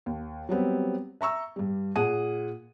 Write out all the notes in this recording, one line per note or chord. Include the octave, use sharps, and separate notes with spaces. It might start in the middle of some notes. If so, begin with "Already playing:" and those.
D#2
F#3 G3 B3 C4
E5 A#5 C#6 E6
G2 G3
A#2 G#4 F#5 D#6 D#7